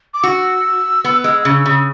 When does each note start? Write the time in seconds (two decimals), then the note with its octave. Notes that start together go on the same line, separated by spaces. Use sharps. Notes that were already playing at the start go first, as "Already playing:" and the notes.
0.14 D6
0.23 F#4 E6
1.05 B3
1.24 G#3
1.45 C#3
1.66 C#3